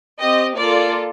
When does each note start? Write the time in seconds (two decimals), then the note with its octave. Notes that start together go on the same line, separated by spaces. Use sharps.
0.19 C4 G4 D#5
0.56 A#3 F4 A4 D5